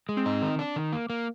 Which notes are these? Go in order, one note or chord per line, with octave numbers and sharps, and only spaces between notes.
G#3
C4
D#4
D#3
D4
D#3
A#3
A#3